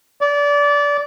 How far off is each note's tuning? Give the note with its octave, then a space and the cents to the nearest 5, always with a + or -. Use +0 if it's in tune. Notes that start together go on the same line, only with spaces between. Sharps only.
D5 -25